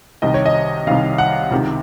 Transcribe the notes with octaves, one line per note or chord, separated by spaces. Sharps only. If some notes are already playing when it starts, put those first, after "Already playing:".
C2 C3 D#3 D#5
C#5
D#5
C2 C3 D#3 F5
F#5
C#2 C3 D#3